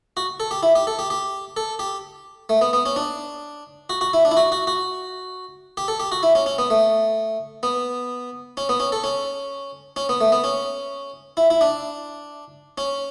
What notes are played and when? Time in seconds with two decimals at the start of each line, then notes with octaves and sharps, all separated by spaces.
0.17 F#4
0.40 A4
0.51 G4
0.63 E4
0.75 G4
0.87 A4
0.99 G4
1.10 G4
1.57 A4
1.79 G4
2.49 A3
2.61 B3
2.73 B3
2.86 C#4
2.96 D4
3.90 F#4
4.01 F#4
4.13 E4
4.25 D4
4.31 E4
4.37 F#4
4.52 F#4
4.67 F#4
5.77 G4
5.88 A4
6.00 G4
6.12 F#4
6.23 E4
6.35 C#4
6.46 C#4
6.58 B3
6.70 A3
7.63 B3
8.57 C#4
8.69 B3
8.80 C#4
8.92 A4
9.04 C#4
9.96 C#4
10.09 B3
10.21 A3
10.32 B3
10.44 C#4
11.37 E4
11.50 E4
11.61 D4
12.78 C#4